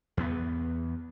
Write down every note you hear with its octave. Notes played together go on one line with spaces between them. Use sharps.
E2 B3